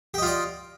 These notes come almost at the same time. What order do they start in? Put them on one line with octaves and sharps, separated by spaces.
G4 D#5 F4 D5